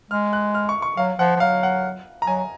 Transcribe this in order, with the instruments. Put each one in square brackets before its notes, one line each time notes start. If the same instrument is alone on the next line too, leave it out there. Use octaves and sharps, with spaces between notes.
[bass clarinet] G#3 [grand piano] F6
[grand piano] F#6
F6
C#6
C#6
[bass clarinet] F#3 [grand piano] F5
[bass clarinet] F3 [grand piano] F#5
[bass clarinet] F3
[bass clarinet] F#3 [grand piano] F5
[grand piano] F#5
A#5
[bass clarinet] F#3 [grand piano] G#5